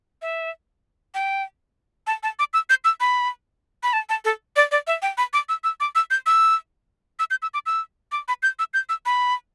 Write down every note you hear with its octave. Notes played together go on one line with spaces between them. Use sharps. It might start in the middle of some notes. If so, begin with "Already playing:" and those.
E5
G5
A5
A5
D6
E6
G6
E6
B5
B5
A5
A5
A4
D5
D5
E5
G5
B5
D6
E6
E6
D6
E6
G6
E6
E6
G6
E6
D6
E6
D6
B5
G6
E6
G6
E6
B5